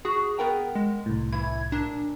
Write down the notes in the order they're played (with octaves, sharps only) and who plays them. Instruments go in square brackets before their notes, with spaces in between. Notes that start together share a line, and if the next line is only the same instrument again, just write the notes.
[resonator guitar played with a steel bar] F#4 [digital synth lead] G#4
[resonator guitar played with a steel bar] B3 A#4 G5
[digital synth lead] G#3
[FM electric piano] C2 A2
[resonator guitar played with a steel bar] E3 E4 [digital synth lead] G#6
[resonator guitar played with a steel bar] A#2 [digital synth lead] D4